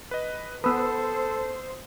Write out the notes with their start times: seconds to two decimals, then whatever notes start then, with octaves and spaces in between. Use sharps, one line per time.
0.11 B4 D#5
0.64 B3 A4 B4 C5 D#6 E6